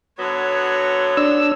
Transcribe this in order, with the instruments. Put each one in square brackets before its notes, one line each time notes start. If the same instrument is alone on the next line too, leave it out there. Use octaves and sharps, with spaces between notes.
[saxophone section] D3 F#3 B3 [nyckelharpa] C#5
[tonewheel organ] D4 E6